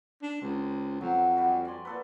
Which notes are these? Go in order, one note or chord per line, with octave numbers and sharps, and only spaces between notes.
D4
C#2 C4
F2 F#3
G3 F#4
D5 G#5 C6
A#2 A4 B4